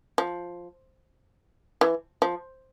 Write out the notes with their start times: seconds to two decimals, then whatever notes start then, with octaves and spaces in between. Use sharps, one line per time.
0.18 F3
1.81 E3
2.22 F3